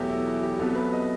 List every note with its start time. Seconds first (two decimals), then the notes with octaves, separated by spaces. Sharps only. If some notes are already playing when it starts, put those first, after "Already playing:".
Already playing: E2 B2 F#3 A3 G4
0.09 E4
0.27 E4
0.43 G4
0.59 C2 C3 F#3 B3 A4
0.75 B4
0.93 D#5